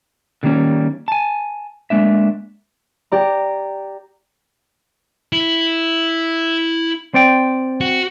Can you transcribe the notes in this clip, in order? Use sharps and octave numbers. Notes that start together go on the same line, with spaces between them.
D3 D#3 G3 A#3 C#4
G#5 A5
G#3 A#3 D4 E5
G4 D5 A#5
E4
C4 D5 G5
F#4